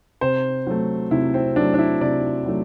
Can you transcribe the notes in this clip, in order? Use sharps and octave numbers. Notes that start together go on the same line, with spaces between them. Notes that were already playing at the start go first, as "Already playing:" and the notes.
C3 C5
F#3 A3
C3 E4
C4
F#3 A3 D4
D4
E4
C3 D5
F#3 A3